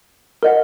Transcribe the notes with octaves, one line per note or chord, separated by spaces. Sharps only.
A#4 D#5 F#5